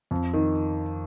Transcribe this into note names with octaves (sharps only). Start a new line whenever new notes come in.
F2
D#3